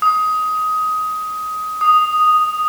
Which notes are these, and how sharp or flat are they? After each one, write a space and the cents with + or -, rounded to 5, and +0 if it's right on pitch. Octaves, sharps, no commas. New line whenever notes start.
D#6 +15
D#6 -5